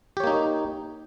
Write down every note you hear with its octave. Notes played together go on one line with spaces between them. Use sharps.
A#3 D#4 G4 C#5